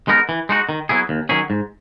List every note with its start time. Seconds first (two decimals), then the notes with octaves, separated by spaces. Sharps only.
0.08 G#3 B3 D#4 A#4
0.29 E3
0.49 G#3 D#4 F#4
0.69 D#3
0.89 F#3 B3 E4 G#4
1.09 D#2
1.29 D#3 F#3 C#4 G#4
1.50 G#2